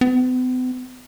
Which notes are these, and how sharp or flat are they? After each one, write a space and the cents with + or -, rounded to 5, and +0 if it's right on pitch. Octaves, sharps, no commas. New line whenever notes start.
B3 +45